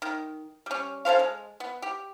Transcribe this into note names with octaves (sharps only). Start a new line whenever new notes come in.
D#3
G3 C#4
C#4 A4 C5 F5
G#3
B3
G4